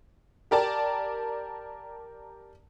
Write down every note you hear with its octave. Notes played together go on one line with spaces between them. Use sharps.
G4 A#4 D5 A5